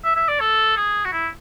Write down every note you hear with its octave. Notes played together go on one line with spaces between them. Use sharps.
E5
E5
D5
A4
G#4
F#4
E4